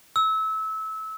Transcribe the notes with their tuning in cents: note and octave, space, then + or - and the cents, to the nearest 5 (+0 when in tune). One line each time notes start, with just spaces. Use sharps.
E6 -25